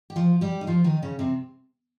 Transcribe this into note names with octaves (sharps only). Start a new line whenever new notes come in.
G4
F3 F4
G3 G4
D#4
F3 F4
D#3 D#4
C#3 C#4
C3 C4